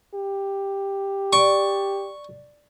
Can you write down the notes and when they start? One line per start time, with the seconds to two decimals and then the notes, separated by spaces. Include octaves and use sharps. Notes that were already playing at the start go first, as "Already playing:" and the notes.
0.15 G4
1.33 D5 C#6